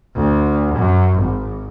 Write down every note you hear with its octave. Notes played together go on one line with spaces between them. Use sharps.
D2
F#2
G#1